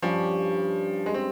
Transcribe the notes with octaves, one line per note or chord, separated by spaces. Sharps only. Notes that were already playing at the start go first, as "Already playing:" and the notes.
G2 F3 G3 C#4 G4
G#3
C4